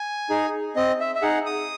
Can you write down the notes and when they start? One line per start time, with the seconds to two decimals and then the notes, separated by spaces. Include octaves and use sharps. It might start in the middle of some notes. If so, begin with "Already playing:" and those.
Already playing: G#5
0.30 D#4 G#4
0.76 C4 D#5
1.00 E5
1.15 E5
1.22 D#4 G#4 F#5
1.46 D#6